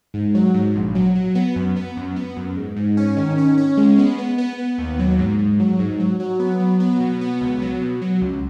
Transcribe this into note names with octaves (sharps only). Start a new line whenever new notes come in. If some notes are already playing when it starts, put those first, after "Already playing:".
G#2
F#3
G#2
A#1
F#3
F#3
B3
F#2
B3
F#2
B3
F#2
G#2
G#2
C#4
D#3
C#4
C#4
G#3
B3
B3
B3
B3
D#2
F#3
G#2
G#2
F#3
G#2
F#3
F#3
B3
F#3
B3
B2
B3
C#2
F#3
B2
F#3
C#2